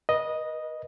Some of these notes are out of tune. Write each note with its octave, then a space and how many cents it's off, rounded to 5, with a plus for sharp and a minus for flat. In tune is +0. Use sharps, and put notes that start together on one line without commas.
B4 -35 D#5 +0